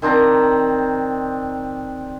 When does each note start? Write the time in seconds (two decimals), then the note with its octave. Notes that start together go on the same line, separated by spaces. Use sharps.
0.02 D#3 C4 D4 A#5